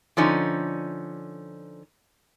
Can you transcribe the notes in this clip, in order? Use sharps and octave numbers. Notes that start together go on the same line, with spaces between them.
D3 F3 C#4 D#4